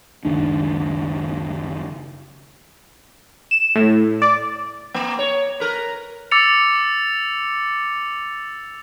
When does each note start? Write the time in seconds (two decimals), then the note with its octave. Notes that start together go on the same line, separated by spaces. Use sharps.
0.25 F#1 C#2 D#3 D4
3.51 E7
3.76 A2
4.22 D5
4.94 A#3
5.19 C#5
5.60 A#4 B4
6.31 D6 E6 A6 C#7 F7